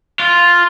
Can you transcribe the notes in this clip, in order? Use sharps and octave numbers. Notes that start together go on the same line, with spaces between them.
F4